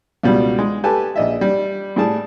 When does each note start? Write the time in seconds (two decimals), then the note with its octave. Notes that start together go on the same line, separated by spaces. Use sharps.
0.23 C#2 B2 G3
0.59 G#3
0.84 G4 A4 B4 G#5 A5
1.16 A#1 D#5 E5
1.41 G3
1.96 A2 G3 G#4 A5